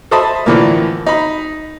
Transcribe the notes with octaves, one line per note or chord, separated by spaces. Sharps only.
A4 C5 D#5 E5 A5 B5
A2 D3 E3 F3 A#3
D#4 B5